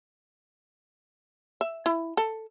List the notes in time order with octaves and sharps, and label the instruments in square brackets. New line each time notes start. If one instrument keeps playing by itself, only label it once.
[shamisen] E5
E4
A4